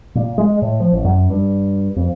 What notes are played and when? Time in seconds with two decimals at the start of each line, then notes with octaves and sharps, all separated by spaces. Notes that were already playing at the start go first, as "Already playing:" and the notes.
0.15 A#2
0.38 G#3
0.62 A2
0.80 F3
0.92 A1
1.05 F#2
1.30 G2
1.96 F2